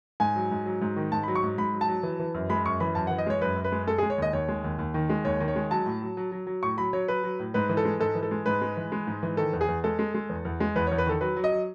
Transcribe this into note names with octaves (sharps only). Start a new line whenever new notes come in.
G#2 G#5
F#3
G#2
F#3
G#2
D#3
G#2 A5
B5
F#3
C#6
G#2
G#2 B5
F#3
A5
F#3
E3
E3
F#2
G#3 B5
F#2 C#6
E3 B5
F#2 A5
F#5
E3
D#5
G#3 C#5
F#2 B4
F#2
B4
G#3
G#3 A4
G#4
G#3
C#5
D#2 D#5
D#2 C#5
G#3
D#2
D#2
D#3
G#3
D#2 C#5
D#3
C#5
G#3
F#3 A5
A2
F#3
F#3
F#3
F#3
A2 C#6
F#3 B5
F#3 C#5
F#3 B4
F#3
A2
G#2 B4
E3
A4
G#3
G#2 A4
E3
A4
G#3
G#2 B4
G#3
E3
G#3
G#2
E3
D#3 A4
E2
G#4
E2
G#3 A4
G#3
G#3
E2
E2
G#3
E2 B4
C#5
E2
B4
D#3 A4
F#3 B4
F#3
D#5
F#3